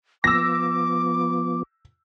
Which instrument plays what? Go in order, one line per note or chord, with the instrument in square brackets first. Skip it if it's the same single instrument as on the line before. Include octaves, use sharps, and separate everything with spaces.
[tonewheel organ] F3 B3 [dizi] D6 [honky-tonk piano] E6 A#6